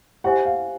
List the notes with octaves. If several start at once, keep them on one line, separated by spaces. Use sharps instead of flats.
E4 G4 C5 E5 F#5 G#5
F5